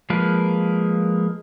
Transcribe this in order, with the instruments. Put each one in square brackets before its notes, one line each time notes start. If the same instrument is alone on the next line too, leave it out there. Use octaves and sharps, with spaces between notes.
[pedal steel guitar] F3 G#3 A#3 A#4 B4